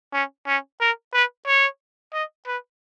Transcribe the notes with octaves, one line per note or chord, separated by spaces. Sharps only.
C#4
C#4
A#4
B4
C#5
D#5
B4